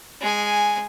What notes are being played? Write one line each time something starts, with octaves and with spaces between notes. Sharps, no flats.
G#3 G#5